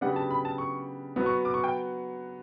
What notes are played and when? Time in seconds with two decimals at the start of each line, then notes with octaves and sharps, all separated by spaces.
0.01 C#3 F#3 B3 D4 G4 F#5
0.16 A5
0.31 B5
0.45 A5
0.58 C#6
1.16 F#3 B3 F#4
1.26 C#6
1.45 D6
1.54 C#6
1.64 G5